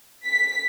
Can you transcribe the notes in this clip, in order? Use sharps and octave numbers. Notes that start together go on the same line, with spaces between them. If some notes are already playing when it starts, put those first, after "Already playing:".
B6